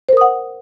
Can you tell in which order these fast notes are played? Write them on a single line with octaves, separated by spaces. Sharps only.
C5 A#4 D#6 F#5